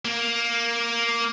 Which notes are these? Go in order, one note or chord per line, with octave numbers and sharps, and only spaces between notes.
A#3